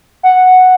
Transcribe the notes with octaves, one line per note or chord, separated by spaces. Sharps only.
F#5